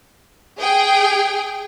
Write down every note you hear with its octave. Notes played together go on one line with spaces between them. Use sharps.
G#4 G5